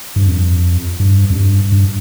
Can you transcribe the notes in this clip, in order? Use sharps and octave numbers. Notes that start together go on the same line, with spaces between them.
G2
F2
G2
F2
G2
G2